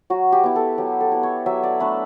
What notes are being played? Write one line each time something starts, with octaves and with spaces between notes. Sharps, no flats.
F#3 F#4
G4
B3 E4
A4
F#3 G4
A4
B3 E4
C#5
F#3 E5
D5
A3 D4 B4